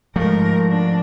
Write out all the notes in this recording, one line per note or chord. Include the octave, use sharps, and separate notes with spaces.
G#2 F3 A3 A#4
D4